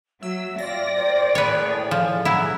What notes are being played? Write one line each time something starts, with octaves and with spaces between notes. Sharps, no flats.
F#3 E5 E6
F4 D5 E5 G5 A#6
A#4 C5 G5
A2 G#4 B4 C#5
F3 D5
F#3 E4 A#5